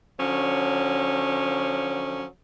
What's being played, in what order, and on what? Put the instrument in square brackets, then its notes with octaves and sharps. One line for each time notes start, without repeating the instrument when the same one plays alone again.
[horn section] D3 F3 F#3 C#4